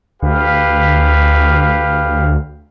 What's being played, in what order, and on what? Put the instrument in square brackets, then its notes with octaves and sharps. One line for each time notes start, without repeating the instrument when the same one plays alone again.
[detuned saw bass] D2 [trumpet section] G4 B4 F5